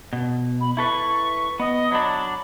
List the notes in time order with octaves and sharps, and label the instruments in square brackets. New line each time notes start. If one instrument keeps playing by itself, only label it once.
[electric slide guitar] B2
[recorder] B5
[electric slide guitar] E4 A4 B4 [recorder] C#6
[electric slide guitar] B3 [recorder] D#5
[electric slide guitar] F#3 D4 [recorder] B5